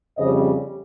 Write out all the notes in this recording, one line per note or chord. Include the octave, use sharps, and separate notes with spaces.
F2 C#3 G3 C5 D#5